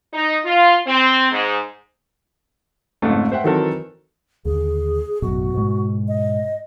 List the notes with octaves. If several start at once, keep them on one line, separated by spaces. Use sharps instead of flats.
D#4
F4
C4
G#2
F2 G#2 C#3 A3
C5 E5 F#5 G5
D#3 E3 F#3 C4 A4 A#4
D#2 D3 G#4
A1 F#2 B2 F#4
G#2 B2 G#3
D#5